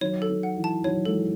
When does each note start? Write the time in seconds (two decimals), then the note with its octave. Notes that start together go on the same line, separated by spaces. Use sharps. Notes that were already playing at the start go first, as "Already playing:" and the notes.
0.01 D#3 F#3 C#5
0.22 A4
0.30 D#3
0.43 F#5
0.57 E3
0.64 A5
0.84 D#3 F#3 C#5
1.05 E3 G#3 A4